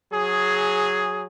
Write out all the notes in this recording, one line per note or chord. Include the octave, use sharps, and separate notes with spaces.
F#3 G#4